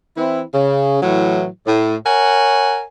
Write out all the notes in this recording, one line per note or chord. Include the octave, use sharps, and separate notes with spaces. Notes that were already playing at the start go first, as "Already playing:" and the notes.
E3 C4 E4
C#3
A2 E3 F#3
A2
A#4 C#5 F#5 G#5